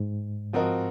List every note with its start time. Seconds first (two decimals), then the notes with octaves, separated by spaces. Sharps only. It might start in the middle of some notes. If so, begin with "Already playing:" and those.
Already playing: G#2
0.53 F3 C4 F#4 A#4 D#5